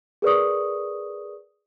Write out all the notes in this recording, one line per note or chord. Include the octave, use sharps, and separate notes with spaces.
G#4 A#4 B4 D5 C#6 D#6